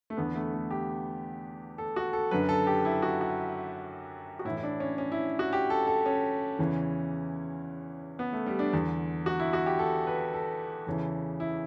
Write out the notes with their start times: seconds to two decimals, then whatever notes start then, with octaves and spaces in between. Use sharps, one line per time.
0.10 A3
0.17 E2 D3 B3
0.35 A3
0.53 A3
0.71 G4
1.78 A4
1.96 F#4
2.13 A4
2.31 F#2 D3 B4
2.49 A4
2.67 G4
2.85 E4
3.02 F#4
3.21 F#4
4.39 F#4
4.45 A2 E4
4.50 E3
4.57 E4
4.63 D4
4.80 C#4
4.98 C#4
5.12 E4
5.39 F#4
5.53 G4
5.70 A4
5.87 A4
6.06 C#4
6.59 E2 C#3 E3
8.19 B3
8.33 A3
8.46 G3
8.59 D4
8.73 E2 D3
9.26 F#4
9.40 E4
9.53 F#4
9.66 G4
9.79 A4
10.07 B4
10.33 A4
10.87 E2 C#3 E3
11.40 E4